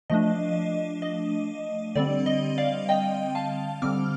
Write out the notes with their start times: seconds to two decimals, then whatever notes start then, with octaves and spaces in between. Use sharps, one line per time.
0.10 F3 A3 D4 D#5
1.02 D#5
1.95 D3 G3 C4 D5
2.26 D#5
2.58 D5 F5
2.89 D#5 G5
3.35 F5 A5
3.82 D3 G3 C4 D6 F6